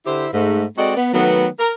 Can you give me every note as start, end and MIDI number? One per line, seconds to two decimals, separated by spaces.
0.06 0.27 50
0.06 0.27 64
0.06 0.27 67
0.06 0.27 72
0.33 0.65 44
0.33 0.65 57
0.77 0.96 56
0.77 0.96 60
0.77 0.96 66
0.77 0.96 69
0.77 0.96 74
0.77 0.96 75
0.96 1.09 59
1.13 1.47 51
1.13 1.47 54
1.13 1.47 57
1.13 1.47 59
1.59 1.72 70